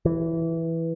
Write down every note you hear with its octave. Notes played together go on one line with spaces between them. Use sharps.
E3